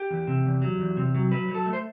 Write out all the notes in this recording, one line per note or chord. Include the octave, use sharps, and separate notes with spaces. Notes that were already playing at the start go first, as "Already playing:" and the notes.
Already playing: G4
E2
C3
E2
F#3
E2
C3
F#3
F#3 B4
F#3
A4
A3
C5